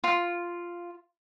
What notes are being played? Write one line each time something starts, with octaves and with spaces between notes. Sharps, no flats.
F4